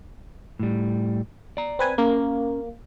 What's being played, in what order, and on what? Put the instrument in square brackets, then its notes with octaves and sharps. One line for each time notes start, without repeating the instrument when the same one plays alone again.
[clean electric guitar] A2 G3
D5 A#5
[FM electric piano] C4 B4 G#5
[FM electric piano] A#3 [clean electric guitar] C#4